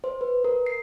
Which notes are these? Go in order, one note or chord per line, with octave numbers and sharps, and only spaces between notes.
C5
B4
A#4
C7